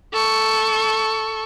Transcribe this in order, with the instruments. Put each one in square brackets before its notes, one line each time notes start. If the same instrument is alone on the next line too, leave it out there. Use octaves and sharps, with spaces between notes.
[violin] A4 C#6